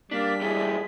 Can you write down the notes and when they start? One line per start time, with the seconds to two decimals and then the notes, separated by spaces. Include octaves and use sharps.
0.11 G3 A#3 D4 B6
0.41 A#2 E3 G#4